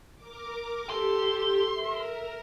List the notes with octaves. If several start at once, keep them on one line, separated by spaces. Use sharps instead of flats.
A#4 D6
G4 A4 C6
A#4 E5